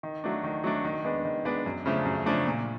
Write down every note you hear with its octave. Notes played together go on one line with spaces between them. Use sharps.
D#3
F#3 A3 D4
D#3
F#3 A3 D4
D#3
G#3 B3 D4
D#3
G#3 B3 D4
F#2
C#3 F3 A3 D4
F#2
C#3 F3 A3 D4
A#2